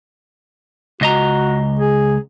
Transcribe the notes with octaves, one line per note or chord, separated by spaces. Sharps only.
C#2 F#4 D#5 A#5
G#4